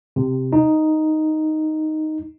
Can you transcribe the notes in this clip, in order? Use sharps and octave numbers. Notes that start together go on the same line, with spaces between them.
C3
D#4